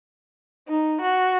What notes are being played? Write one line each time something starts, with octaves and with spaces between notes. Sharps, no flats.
D#4
F#4